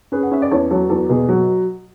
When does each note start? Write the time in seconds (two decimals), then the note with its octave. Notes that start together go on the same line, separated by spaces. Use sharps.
0.12 C#4 G#4 B4
0.23 F#5
0.31 C#4 E5
0.42 D5
0.51 E2 A4 C#5
0.71 F#3 A4 C#5
0.90 E2 A4
1.09 B2 G#4
1.29 F#3